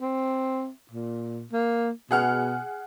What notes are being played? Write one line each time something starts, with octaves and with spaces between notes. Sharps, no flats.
C4
A#2
A#3
B2 G#4 F#5 F6